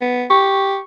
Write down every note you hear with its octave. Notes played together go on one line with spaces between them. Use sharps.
B3
G4 C#6